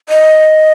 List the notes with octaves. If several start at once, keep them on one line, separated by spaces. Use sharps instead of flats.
D#5